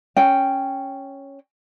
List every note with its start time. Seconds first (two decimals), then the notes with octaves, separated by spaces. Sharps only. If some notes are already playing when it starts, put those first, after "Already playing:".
0.17 C#4 G5